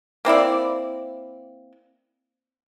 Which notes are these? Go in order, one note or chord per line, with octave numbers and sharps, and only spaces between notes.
A#3 C4 E4 D5